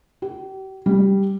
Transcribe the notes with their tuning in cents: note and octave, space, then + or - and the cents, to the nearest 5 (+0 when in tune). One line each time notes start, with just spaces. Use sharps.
G4 -40
G3 +0